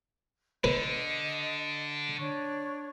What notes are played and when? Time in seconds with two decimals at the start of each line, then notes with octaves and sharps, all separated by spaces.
0.64 D3 B4 D#5
2.19 D4 C#5 C#6